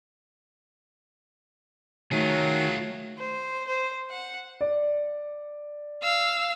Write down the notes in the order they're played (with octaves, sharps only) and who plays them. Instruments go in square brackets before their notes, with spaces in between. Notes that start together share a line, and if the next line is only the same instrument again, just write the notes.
[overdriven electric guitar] D#3 [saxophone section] F#3 [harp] A3 C#5 [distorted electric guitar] F4 G#4
[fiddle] C5
C5
F#5
[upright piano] D5
[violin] F5 E6